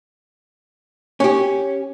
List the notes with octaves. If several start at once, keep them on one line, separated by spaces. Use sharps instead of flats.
C#4 G4